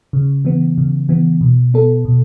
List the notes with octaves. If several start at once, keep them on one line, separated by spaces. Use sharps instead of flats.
C#3
E3 B3
C#3
E3 B3
B2
B3 A4
B2